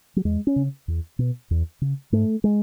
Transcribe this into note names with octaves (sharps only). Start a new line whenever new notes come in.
F#3
E2 G#3
C#4
C#3
E2
B2
E2
C#3
G#2 A3
G#3